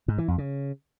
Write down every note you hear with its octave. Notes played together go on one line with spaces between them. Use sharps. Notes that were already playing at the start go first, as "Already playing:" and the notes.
G#2
E3
F2
C#3